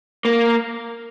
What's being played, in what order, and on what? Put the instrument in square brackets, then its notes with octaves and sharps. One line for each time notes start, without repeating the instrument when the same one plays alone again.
[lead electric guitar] A#3